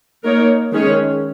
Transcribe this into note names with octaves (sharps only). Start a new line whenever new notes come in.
A#3 D#4 A#4 C#5
D#3 G#3 C#4 G#4 C#5